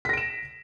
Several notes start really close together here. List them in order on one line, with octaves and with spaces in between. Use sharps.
B6 A#6 D7 E7